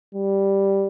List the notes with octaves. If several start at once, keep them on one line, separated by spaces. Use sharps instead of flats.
G3